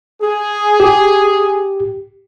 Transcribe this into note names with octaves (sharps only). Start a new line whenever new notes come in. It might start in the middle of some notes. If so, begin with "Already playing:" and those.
G#4
G4